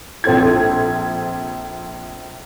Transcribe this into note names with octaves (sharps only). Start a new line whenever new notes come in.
A#1 C4 A4 G#6